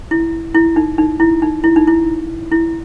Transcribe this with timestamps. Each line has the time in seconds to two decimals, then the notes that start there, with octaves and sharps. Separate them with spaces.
0.11 E4
0.55 E4
0.76 D#4
0.98 D#4
1.20 E4
1.42 D#4
1.64 E4
1.76 D#4
1.87 E4
2.52 E4